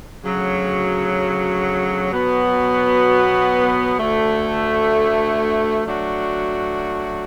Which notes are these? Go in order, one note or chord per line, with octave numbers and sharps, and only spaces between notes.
D2 C#3 F#3
B2 F#3 B3 F#4
D2 D3 A3
F#3 A3 D4 F#4